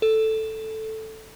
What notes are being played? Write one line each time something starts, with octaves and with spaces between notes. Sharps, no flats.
A4